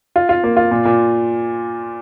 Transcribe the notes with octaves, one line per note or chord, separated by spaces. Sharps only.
F4
F4
A#3
F4
A#2
A#2